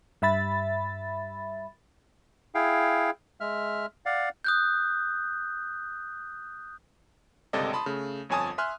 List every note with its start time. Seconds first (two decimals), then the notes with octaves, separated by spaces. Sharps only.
0.22 G2 E5 B5 A6
2.55 E4 G#4 F5 G5
3.40 G#3 E5 F6
4.06 D5 F5 F#5
4.44 D#6 F#6 G6
7.53 G1 C#2 C3 A4 D5 D#5
7.73 A5 B5 C6 D#6
7.86 C#3 A3
8.29 G1 F2 C#5 G#5 A5 D#6
8.58 E5 G#5 C6 F6 F#6